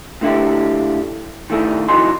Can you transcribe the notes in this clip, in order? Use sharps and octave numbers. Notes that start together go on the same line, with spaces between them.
A2 D3 E4 G4
D#3 A3 E4 G#4
F2 D#4 E4 F#4 G#5 C6